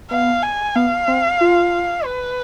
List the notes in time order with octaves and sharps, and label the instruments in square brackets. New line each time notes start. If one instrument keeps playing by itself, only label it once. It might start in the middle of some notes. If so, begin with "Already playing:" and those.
[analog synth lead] B3 [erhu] F5
[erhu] G#5
[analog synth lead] B3 [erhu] F5
[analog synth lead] C4
F4
[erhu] B4